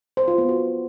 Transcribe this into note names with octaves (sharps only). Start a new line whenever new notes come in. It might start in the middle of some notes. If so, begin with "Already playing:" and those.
C5
F4
B3
F#4